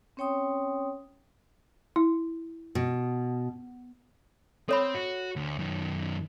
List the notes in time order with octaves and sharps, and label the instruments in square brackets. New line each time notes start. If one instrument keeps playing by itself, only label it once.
[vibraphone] C4 C#4 C#5 G5 C6 D#6
[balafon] E4
[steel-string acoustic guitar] B2
[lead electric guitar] C4 [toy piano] A4 C#5 B5
[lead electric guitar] F#4
D2
F#2 D#3